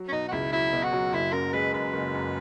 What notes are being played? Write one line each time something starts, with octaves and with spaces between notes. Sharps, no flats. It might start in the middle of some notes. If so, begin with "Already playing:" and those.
Already playing: F#3
C#4
B2 D#4
F#4
C#2 E4
F#3 E4
B2
F#4
F#3
F#1 E4
F#2 A#4
G#3 B4
F#2 B4
F#1
F#2